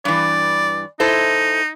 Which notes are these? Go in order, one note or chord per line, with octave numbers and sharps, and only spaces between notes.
G2 E3 D5
D#4 E4 A4 C5